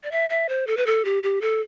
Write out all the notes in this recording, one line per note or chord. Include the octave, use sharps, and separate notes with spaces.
D5
E5
E5
C5
A4
B4
A4
G4
G4
A4